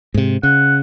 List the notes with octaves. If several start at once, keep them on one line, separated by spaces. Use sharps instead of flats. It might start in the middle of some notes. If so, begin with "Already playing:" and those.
G#2 C3
C#3 F#5